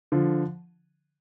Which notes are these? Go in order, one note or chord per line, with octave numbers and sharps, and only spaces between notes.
D3 F3